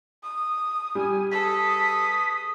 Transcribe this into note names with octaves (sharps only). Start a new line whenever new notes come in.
D#6
G3 G#5
G#4 A4 B4 D#6 B6